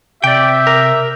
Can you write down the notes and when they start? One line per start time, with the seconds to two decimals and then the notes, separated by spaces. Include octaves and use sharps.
0.24 C3 G4 D5 E5 G5
0.67 A#4